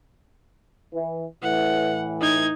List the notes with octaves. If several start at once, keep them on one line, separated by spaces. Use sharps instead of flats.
E3
A2 E3 F#5
D#4 G#6